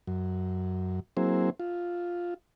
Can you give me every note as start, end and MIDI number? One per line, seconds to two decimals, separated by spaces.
0.07 1.00 42
1.17 1.50 54
1.17 1.50 58
1.17 1.50 60
1.17 1.50 64
1.17 1.50 68
1.17 1.50 72
1.60 2.34 65